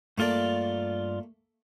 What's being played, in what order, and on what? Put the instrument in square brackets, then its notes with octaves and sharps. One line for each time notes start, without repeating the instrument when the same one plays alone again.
[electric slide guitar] G2 F4 D5 [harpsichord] A3 A#3 A4